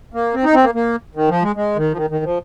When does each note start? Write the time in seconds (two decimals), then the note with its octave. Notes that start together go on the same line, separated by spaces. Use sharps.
0.14 A#3
0.34 C4
0.44 D#4
0.54 C4
0.64 A#3
0.75 A#3
1.15 D#3
1.29 F3
1.43 G#3
1.56 G#3
1.76 D#3
1.93 F3
1.97 D#3
2.10 D#3
2.24 F3